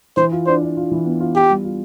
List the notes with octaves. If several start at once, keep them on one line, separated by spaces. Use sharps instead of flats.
E3 C5
F4
D4 C5
D4
F4
E3
B3
F4
F4 G4
G3
F4